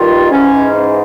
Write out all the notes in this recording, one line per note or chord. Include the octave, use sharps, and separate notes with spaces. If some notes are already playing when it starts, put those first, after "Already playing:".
Already playing: G2 D#3 F4
G#2 E3 C#4